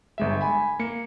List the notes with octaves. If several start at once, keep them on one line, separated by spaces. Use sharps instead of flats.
G1 G#3 E5
G#5 B5
A#3 C#7